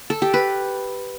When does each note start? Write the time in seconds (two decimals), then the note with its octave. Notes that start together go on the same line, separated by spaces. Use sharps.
0.10 A4
0.22 G4
0.34 B4